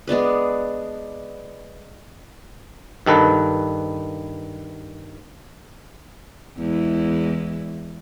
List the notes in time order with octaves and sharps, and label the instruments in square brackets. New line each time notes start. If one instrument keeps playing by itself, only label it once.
[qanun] G#3 B3 D4 B4
[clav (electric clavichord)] G2 D#3 A4 B4
[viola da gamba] E2 G#3 E4